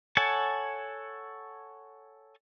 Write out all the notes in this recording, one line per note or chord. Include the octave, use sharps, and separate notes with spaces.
A4 C#5 F#5 G#5 A5